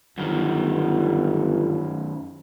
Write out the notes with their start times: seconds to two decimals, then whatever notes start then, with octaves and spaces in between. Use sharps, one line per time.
0.18 G1 F#2 D#3